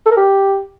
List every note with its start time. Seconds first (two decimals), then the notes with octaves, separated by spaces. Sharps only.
0.06 A4
0.12 A#4
0.17 G4